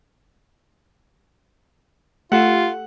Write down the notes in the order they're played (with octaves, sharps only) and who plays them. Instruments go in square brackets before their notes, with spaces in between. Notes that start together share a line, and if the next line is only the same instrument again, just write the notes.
[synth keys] A3 G4 A4 [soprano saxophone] F4 [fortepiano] F#5